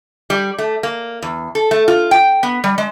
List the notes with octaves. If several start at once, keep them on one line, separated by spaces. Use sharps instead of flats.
G3
A3
A#3
E2
A4
A3
F4
G5
B3
G3
G#3